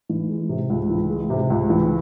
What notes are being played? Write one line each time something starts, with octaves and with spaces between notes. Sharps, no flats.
E3
G#3
C3
C#2
E3
G#3
C3
C#2
E3